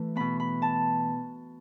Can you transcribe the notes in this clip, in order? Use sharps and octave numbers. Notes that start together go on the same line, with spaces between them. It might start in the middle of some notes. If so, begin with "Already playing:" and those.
Already playing: E3 A3
B2 B3 B5
B5
A5